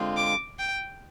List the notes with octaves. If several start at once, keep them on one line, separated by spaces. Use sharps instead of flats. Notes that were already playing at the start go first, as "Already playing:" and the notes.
Already playing: D3 G#3 C4 F4
D6
G5